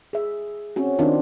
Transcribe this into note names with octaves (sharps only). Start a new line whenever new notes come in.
G#4 E5
C4 C#4 F#4
D#3 C4 D4 D#4 F4